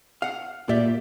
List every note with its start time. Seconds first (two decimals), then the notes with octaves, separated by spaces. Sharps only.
0.22 F5 F#5
0.69 A#2 G4 D5 E5